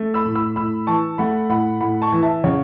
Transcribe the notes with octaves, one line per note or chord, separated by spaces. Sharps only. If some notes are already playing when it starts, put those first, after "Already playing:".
Already playing: A3
B5 E6
A2
B5 E6
A2 B5 E6
E3 A5 C#6
A3 F#5 B5
A2 F#5 B5
A2 F#5 B5
A5 C#6
E3
E5 A5
C#3 C#5 F#5